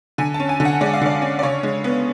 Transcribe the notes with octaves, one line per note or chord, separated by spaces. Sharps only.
D3 G#5
A5
C#4
G#5
D3
F#5
G#3 D5
F5
D3 D5
C#4
D5
C#3 C#5
G#3
B3